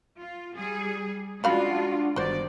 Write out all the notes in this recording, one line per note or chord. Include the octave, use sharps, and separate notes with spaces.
F4
G3 G#4
C#3 G#3 D4 F4 F#4 F5 B5
G1 D#3 G#3 F#4 C5 D5